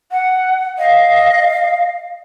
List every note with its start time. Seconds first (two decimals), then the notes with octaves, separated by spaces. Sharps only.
0.11 F#5
0.78 D#5 F5